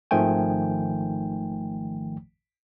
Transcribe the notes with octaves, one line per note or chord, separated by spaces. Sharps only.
G#1 D#3 F3 A3 G5 G#5